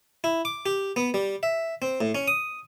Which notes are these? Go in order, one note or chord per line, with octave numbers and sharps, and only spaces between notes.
E4
D6
G4
B3
G3
E5
C4
A2
C#4
D#6